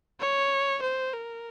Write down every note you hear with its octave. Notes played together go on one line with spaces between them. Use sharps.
C#5
C5
A#4